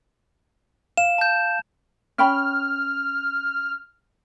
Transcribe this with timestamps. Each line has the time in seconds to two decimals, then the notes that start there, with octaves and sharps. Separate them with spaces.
0.98 F5 E7
1.18 A5 G6
2.18 C#4 G5 B5 F6